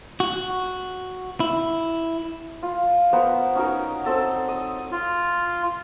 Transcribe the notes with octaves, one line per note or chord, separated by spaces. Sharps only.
F#4
E4
F4
B3 A#4 C5 F#5
C#4 D#4 F#4 A#4
C4 A4 D#5 A5
D#5
F4